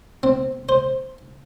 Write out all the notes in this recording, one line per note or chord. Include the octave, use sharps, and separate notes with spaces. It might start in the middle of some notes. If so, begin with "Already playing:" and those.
C4
C5